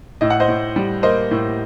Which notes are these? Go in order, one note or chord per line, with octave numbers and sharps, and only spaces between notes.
A2 D#5
F#5
C5 D#5
A2
G3
A#3 C5 D#5
A2